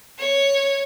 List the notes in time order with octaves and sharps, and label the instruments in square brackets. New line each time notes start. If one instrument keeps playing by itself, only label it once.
[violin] C#5